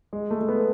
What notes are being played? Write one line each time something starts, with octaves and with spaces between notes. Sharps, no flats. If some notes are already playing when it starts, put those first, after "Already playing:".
G#3
A3
A3
B3